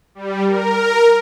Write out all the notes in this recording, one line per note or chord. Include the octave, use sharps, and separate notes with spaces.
G3
A#4